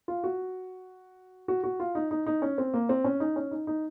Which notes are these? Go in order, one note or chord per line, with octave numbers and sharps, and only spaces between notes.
F4
F#4
F#4
F#4
F4
D#4
D#4
D#4
C#4
C4
A#3
C4
C#4
D#4
C#4
D#4
D#4